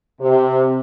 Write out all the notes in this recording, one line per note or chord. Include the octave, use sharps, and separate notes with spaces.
C3